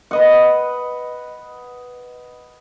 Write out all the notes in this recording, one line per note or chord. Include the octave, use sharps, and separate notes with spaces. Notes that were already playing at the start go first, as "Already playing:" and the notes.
B4 D#5 F#5